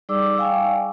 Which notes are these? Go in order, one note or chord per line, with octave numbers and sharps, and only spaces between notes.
G3 D#4 G#4 D5 D6 E6
F5 G5 G#5 C#6